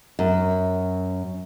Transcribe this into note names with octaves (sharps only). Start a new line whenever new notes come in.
F#2